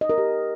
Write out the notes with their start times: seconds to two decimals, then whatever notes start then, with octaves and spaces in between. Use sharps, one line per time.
0.01 D#5
0.10 A#4
0.18 G4